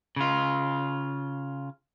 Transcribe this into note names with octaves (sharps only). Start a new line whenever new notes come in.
C#3 F4